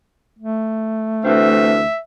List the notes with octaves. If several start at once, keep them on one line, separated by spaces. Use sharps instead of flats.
A3
D2 E3 C4 E5